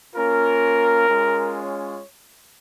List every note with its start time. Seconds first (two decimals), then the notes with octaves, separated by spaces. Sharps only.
0.15 A#3 C#4 F4 A#4
1.09 G#3 C#4 F4
1.55 C#5